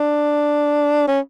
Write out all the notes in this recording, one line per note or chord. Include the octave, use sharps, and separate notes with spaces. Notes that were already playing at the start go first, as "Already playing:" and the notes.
Already playing: D4
C#4